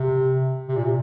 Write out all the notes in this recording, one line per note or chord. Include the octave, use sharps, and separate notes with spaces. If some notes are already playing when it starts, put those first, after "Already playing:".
Already playing: C3
C3
A#2
C3